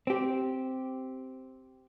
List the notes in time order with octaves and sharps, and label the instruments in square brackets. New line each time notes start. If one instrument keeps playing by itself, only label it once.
[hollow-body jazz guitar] C4 G4